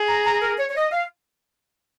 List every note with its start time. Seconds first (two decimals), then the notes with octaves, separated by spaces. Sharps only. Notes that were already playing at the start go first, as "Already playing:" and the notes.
Already playing: G#4
0.08 A#5
0.25 A#5
0.42 A#4
0.59 C#5
0.70 C#5
0.76 D#5
0.92 F5